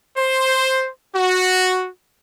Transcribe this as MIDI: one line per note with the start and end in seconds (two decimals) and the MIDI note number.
0.17 0.89 72
1.15 1.87 66